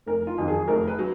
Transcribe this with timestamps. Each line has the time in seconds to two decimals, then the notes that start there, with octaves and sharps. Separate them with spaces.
0.06 F1 A#4
0.27 F4
0.38 F2 D#3 F#3
0.48 G#4
0.68 F1 A#4
0.88 B4
0.99 F#3